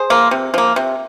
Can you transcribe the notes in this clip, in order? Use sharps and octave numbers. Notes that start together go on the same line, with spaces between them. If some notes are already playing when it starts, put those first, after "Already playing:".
Already playing: G#4 C5
F3 A#3
C3
F3 A#3
C3